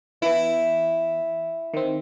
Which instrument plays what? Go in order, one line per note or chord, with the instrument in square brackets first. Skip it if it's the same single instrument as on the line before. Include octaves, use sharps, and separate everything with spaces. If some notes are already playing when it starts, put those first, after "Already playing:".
[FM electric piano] E3 B3 [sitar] E4
[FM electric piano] D#3 C4